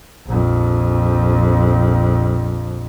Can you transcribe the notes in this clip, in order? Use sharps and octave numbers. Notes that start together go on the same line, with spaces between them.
A#1 F2